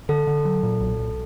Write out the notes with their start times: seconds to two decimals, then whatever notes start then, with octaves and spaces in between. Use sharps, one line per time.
0.09 D3 A4
0.27 D3
0.45 F#3
0.63 A#2
0.81 B1
0.99 B1